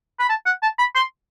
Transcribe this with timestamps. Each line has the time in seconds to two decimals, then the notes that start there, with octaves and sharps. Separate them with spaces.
0.20 B5
0.29 A5
0.46 F#5
0.62 A5
0.79 B5
0.95 C6